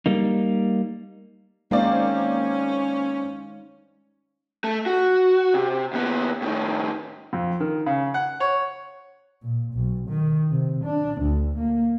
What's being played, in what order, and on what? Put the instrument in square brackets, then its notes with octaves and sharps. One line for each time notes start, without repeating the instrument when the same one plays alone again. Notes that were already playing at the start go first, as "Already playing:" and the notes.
[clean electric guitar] G3 A#3 D#4
[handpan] G#3 D#4 F5 [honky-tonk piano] A#3 C4 D5 [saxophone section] C#4
[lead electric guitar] A3
F#4
C3
D#2 B3
A2 D#3
[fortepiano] F2
D#3
C#3
F#5
C#5
[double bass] A#2
B1
D#3
C3
D4
D2
A#3